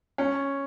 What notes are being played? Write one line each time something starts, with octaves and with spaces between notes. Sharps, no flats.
C#4